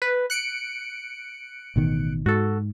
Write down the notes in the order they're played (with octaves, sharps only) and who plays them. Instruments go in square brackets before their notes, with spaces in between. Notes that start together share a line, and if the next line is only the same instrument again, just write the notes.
[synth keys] B4
F#6 C#7 D7
[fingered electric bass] A1 B2 D#3
[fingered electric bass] G#2 [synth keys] F#4 A4